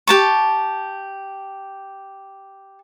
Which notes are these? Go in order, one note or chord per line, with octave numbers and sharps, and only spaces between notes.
G4 A5 C#6